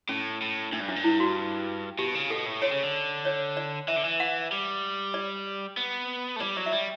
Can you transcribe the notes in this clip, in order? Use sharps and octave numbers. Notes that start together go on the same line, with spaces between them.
A2 C#4
A2
A2 D4
G2
F#2 D4
G2
E4
F#4
B2 G4
C#3
B2 A4
A2
D3 C#5
C#3
D3
C#5
D5
E3 E5
D3
E3
F#5
G3
D5
B3
A3
G3 D5
F#3 D5
E5
G3 D5